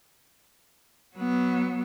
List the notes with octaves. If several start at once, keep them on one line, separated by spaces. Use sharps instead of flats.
F#3 B3